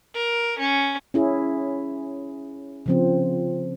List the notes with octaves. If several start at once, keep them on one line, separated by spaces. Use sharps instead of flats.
A#4
C#4
C#4 E4 G#4
C#3 F3 C4